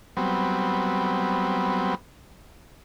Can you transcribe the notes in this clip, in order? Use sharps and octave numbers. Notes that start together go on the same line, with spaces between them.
F#3 G3 B3 C4